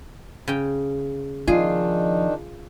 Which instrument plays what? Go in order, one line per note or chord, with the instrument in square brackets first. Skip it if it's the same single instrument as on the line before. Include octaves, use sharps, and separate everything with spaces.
[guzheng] C#3 G5
[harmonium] D#3 D4 D#4 [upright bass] F3 B3 [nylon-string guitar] F4 [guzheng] G#4